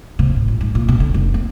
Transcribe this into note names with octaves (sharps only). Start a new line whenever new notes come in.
C3
A2
A#1
G#2
A#2
B2
D3
F1
C4